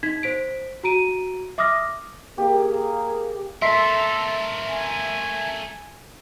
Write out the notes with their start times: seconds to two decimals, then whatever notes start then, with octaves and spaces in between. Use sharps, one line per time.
0.03 D#4 G#6 B6
0.23 C5 B6 D7
0.83 F#4 A#5 D7 D#7
1.58 E5 D6 D#6 F6 A#6
2.38 A#3 G4 G#4
3.62 A3 A4 A#4 E5 C6 B6 C7
4.69 G#5